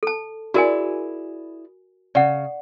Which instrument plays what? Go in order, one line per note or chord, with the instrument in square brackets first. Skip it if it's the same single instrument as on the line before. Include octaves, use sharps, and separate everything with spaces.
[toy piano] A4 A5
[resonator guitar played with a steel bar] E4 G#4 D5 [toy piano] F#4 A#4 G#5
[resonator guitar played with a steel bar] C#3 [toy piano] D5 F#5